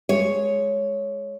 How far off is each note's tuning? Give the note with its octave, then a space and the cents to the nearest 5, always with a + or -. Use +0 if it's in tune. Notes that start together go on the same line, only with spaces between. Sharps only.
G#3 +0 C#5 +0